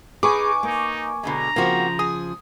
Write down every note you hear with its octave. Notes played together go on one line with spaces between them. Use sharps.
D#4 G#4 B4 G#5 C#6 D6
A#3 D#4
B2 D3 G#3 A#5
C#3 F3 A#3 C4 F#4
G#4 D#6